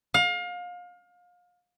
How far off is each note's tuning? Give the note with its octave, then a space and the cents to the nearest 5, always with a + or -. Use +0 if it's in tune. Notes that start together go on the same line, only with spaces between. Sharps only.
F5 +30